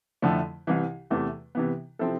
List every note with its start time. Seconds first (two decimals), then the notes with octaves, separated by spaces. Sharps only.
0.22 F2 D3 F3 A3 E4
0.67 C2 C3 E3
1.10 E2 C3 E3 A3
1.55 C3 E3 B3
1.99 C3 F3 C4 E4 A4